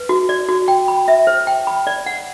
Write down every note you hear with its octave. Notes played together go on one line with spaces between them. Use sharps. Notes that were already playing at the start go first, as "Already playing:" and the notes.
Already playing: B4
F#4
D5
F#4
G5
B5
E5
C5
G5
B5
D5
F#5